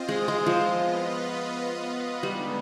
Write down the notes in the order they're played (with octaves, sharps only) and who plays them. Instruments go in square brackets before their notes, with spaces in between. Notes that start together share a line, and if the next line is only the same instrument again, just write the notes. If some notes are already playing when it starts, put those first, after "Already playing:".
Already playing: [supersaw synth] C4 F4 C5 D#5
[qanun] G#3
G#3
F3
[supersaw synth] B3 F4 B4 D#5
[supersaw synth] D3 G#3 B3 D#4 [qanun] G3